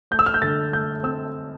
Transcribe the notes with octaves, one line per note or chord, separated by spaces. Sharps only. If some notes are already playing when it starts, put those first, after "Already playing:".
A3 G6
E6
F6
G6
D3 A6
A3 G6
C4 E6